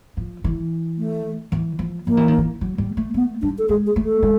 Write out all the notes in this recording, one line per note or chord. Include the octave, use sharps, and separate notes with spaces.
F3
E3
A3
E3
F3
F3 A#3
E3
D#3
E3
F#3
G3
A3
A3 B3
G3 D4
A4
G#3 G#4
G#4
A3
A4
G#3